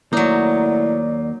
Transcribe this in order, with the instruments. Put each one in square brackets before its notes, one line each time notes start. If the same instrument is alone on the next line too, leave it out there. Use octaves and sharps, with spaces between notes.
[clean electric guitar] D#2 A#3 [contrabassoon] A2 [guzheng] F#3 D#4 [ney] D5